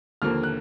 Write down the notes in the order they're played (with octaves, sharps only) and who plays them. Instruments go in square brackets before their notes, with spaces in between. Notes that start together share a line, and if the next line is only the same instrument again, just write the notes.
[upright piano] D#2 D3 F3 A#3 F6
F#6